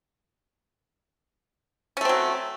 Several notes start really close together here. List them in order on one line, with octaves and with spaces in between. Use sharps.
C#4 A3 C4 F#3